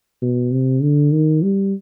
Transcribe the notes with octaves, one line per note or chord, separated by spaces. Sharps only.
B2
C3
D3
D#3
G3